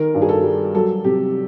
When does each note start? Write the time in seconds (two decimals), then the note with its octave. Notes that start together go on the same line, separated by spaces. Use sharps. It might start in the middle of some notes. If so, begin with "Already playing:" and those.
Already playing: D#3 A#4
0.14 G2
0.22 G#4
0.29 A4
0.44 G3
0.75 F#3 A4
1.04 C3 G4